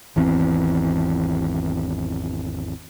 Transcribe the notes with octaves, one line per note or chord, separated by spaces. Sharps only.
G#1 E2 E3 C4